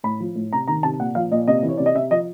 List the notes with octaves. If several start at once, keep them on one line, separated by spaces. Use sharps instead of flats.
A2 B5
F3
A2
C3 A#5
D#3 A#5
C3 A5
A#2 F#5
F3 F5
A#2 D#5
C3 D#5
E3
C#5
C3 D5
D#5
C3 E5
F3 D#5